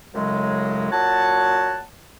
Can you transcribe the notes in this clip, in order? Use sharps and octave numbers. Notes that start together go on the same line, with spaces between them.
F#2 A2 C#3 F#3 G#3
A#2 F#3 F#4 C#5 F#5 A5